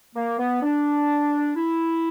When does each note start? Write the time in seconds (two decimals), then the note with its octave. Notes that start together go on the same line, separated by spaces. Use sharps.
0.16 A#3
0.39 B3
0.62 D4
1.56 E4